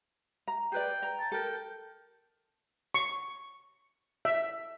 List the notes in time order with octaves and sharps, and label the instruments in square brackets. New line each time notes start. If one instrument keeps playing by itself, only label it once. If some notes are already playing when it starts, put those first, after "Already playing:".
[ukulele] A#5
[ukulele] G#4 B4 D5 [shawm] G5
[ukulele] A#5
[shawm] A5
[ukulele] A4 A#4 [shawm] G5
[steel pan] C#6
E5